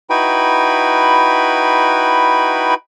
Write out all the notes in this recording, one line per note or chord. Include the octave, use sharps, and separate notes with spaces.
D#4 E4 F#4 B4 G5 B5